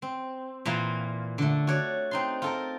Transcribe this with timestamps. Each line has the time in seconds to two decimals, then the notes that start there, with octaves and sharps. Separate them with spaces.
0.02 C4
0.66 A#2 E3 A#3 F4
1.38 D3 A3
1.67 F#4 C#5 D5
2.11 C4 D#4 C6
2.42 F4 A4 A#4